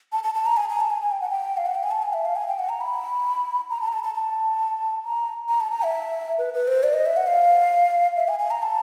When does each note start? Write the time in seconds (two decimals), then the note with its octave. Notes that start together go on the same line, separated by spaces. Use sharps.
0.12 A5
0.24 A5
0.34 A5
0.46 A#5
0.57 G#5
0.69 G#5
0.80 A5
0.90 G#5
1.02 G#5
1.11 G5
1.21 F#5
1.30 G5
1.57 F5
1.66 F#5
1.75 G5
1.83 G#5
1.91 A5
2.03 G#5
2.13 E5
2.25 F5
2.36 G#5
2.48 G5
2.59 F#5
2.69 A#5
2.81 B5
3.70 A#5
3.81 A5
3.88 A#5
3.93 A5
4.03 A5
4.15 A5
5.05 A#5
5.49 A#5
5.60 A5
5.71 A#5
5.82 E5
6.38 B4
6.54 B4
6.68 C5
6.83 D5
6.93 D#5
7.06 E5
7.17 F#5
7.27 F5
8.17 E5
8.28 G#5
8.39 G#5
8.51 A#5
8.62 A5